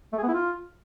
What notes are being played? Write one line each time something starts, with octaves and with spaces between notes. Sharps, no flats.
A3
G#4
B3
E4
F4